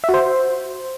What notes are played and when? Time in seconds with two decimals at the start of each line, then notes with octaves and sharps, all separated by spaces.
0.04 E5
0.09 F#4
0.14 C5